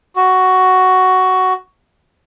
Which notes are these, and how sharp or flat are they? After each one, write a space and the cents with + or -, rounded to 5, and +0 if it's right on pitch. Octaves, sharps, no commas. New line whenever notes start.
F#4 +5